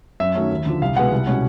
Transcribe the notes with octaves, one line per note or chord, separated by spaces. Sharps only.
F#2 E5
D#3 F#3 A3 C#4
D#2
D3 F3
C2 F5
B2 G#3 B3 F#5
C2
B2 G#3 C#4